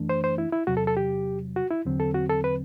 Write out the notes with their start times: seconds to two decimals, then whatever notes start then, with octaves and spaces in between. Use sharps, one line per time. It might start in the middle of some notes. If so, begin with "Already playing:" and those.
Already playing: F#2 E3 A3 D4
0.09 C5
0.24 C5
0.38 E4
0.52 E4
0.67 E2 C3 F#3 F#4
0.77 A4
0.87 A4
0.97 G4
1.56 F#4
1.71 E4
1.86 E2 D3 F#3 C4
2.00 A4
2.15 F#4
2.29 A4
2.44 B4